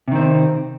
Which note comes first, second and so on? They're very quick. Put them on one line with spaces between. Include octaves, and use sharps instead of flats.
C3 D#3 C4